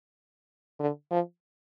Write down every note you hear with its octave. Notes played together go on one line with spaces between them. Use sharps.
D3
F3